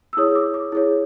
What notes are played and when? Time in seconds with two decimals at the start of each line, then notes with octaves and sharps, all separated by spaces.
0.13 E6
0.17 E4 G#4 C#5 D#6
0.35 D6
0.54 D6
0.72 E4 G#4 C#5